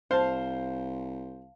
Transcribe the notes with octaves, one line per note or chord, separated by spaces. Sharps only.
C2 C5 F5 A5